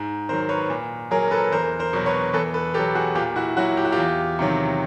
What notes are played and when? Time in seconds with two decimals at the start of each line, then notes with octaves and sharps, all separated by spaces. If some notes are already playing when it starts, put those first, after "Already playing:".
Already playing: G#2
0.29 D#3 A#4 C5
0.33 F#3
0.49 B4 C#5
0.70 A#2
1.11 F#3 G#4 A#4
1.28 A#4
1.31 A4 B4
1.51 E2 A#4 C5
1.79 A#4 C5
1.93 B2 F#3
2.06 B4 C#5
2.33 E2 A4 B4
2.54 A4 B4
2.74 B2 G4 A4
2.79 F#3
2.95 F#4 G#4
3.15 A#2 F4 G4
3.36 E4 F#4
3.57 F#3 E4 F#4
3.77 G4
3.85 F#4
3.92 F4 G4
3.98 E2
4.39 C3 D#3 F#3